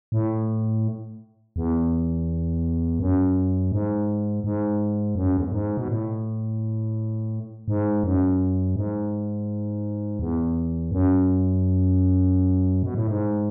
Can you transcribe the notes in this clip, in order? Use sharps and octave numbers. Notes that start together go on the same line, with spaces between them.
A2
E2
F#2
G#2
G#2
F#2
E2
F#2
G#2
B2
A2
G#2
F#2
G#2
E2
F#2
B2
A2
G#2